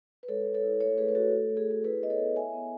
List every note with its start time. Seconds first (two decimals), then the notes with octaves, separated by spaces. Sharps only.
0.23 B4
0.28 G#3 A4 C#5
0.45 G#3
0.54 A4 C#5
0.63 E4
0.80 A3 A4 C#5
0.98 A3 G#4 B4
1.08 B4
1.15 F#4 A4
1.33 A3
1.50 A3
1.57 G#4
1.67 F#4 A4
1.84 E4 G#4 B4
2.02 B3 D#5
2.10 A4 C#5
2.19 B3
2.36 E4 E5 G#5
2.53 B3